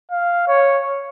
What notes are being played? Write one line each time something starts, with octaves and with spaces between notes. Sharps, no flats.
F5
C#5